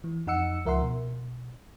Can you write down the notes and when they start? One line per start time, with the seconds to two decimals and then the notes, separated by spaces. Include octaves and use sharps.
0.04 E3
0.27 F2 D#4 F#5 E6 C#7
0.65 C#2 F3 A#4 E5 F#5 C6
0.82 B2